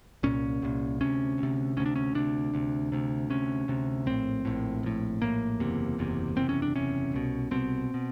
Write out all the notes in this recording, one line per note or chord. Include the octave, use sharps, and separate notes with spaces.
C2 A#2 C#4
C2 A#2
D2 C3 C#4
D2 C3
D2 C3 C#4
D4
C#4
D2 C3 D4
D2 C3
D2 C3
D2 C3 C#4
D2 C3
A#1 A2 C4
A#1 A2
A#1 A2
A#1 A2 A#3
F#1 E2 C3
F#1 E2 C3
F#1 E2 C3 C4
C#4
D4
F#1 E2 C3 C#4
C2 B2
C2 B2 C4
B2